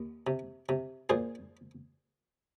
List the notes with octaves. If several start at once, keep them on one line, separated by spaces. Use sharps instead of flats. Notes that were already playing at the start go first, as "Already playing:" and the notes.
Already playing: D#2
C3
C3
A#2 G#4 C5